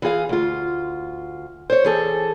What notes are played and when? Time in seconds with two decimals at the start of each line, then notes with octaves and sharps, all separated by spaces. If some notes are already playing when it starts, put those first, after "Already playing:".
0.02 E3 F4 G#4 F5
0.29 D2 F4
1.70 C5 C#5
1.85 E3 G#4 A4